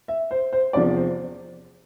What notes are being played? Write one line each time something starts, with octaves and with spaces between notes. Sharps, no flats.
E5
C5
C5
E2 C3 F3 D5
C5